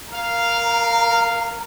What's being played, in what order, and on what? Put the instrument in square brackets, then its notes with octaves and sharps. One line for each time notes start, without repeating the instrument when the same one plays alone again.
[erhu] A#4 [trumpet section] F5